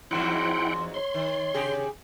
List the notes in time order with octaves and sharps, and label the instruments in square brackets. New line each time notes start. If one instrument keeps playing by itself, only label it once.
[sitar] E2 G#2 F#3 [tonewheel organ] E4 F#5 G5 [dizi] C6
[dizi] C#5 [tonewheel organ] C6
[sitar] D#3
C3 G4 G#4